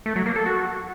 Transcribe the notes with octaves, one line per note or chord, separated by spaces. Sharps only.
A3
F#3
A#3
A4
F#4